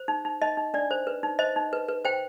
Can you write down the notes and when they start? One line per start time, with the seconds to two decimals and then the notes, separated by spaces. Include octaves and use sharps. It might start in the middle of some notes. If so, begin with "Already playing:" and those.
Already playing: C5
0.08 D#4
0.25 D#4
0.42 D#4 D#5
0.57 D#4
0.74 D4 D5
0.91 C5
1.07 B4
1.23 D#4
1.39 C5 D#5
1.56 D#4
1.73 B4
1.88 B4
2.05 C5 G5